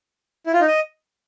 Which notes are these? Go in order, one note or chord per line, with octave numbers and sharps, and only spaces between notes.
E4
F4
D#4
D#5